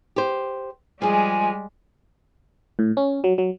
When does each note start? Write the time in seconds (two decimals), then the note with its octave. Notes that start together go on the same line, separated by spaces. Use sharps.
0.16 G4 C5
1.02 F3 G3 G#3 G#4 G#5
2.79 A2
2.97 C#4
3.24 F#3
3.38 F#3